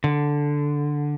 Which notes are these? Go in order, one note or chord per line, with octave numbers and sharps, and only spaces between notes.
D3